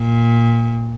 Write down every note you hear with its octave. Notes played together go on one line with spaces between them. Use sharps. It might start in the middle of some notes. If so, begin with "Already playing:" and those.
Already playing: A#2